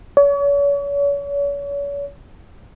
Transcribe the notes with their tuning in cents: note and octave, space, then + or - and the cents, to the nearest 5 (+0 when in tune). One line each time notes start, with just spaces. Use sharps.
C#5 +40